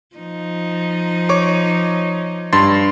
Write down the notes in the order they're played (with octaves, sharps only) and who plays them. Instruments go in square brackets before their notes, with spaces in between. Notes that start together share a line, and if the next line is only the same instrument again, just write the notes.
[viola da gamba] F3 D#4
[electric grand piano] C#5 C#6 D6
G2 C6 A6